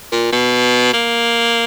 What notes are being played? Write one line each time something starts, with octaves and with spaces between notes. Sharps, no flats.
A#2
B2
A#3